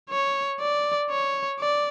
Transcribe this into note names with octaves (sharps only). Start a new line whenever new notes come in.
C#5
D5
C#5
D5